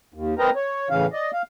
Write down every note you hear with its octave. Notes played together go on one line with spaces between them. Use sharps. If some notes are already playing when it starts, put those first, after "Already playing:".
D#2
C4 A#4 B4 D#5 G5 A#5
C#5
A2 C#3 E3 C#4 F5
D5 D#5
F5